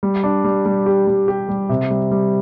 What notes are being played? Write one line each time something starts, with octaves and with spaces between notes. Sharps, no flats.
G3
D4
G3
G3
G4
G3
G4
G3
C3
G3
G3